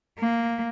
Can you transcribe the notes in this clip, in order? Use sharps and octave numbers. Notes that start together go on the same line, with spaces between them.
A#3